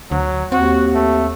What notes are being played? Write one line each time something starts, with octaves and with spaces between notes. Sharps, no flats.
D2 F#3
D#2 C4 F#4
A3